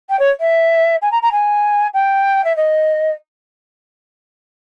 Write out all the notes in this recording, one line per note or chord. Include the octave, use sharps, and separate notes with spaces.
G5
C#5
E5
G#5
A#5
A#5
G#5
G5
E5
D#5